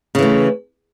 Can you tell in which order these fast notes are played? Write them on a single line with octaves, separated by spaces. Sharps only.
C#3 E3 A3